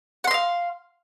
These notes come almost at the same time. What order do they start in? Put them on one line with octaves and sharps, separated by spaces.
F#5 C6 D#5 F5